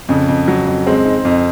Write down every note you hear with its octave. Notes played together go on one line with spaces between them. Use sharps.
F2 C#3
F2
F#3
F2
G#3 C4
D#4
F2